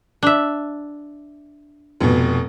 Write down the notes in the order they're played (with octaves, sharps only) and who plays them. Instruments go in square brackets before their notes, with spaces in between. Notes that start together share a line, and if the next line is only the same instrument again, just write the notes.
[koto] D4 E5
[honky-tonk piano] F1 B2